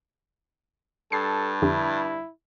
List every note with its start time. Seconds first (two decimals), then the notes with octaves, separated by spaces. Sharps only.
1.12 G2 A4 C7
1.62 F2 D3 E4 G4